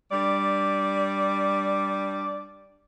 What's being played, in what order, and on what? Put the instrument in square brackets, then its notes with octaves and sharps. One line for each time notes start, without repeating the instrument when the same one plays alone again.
[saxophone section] G3 D4 D5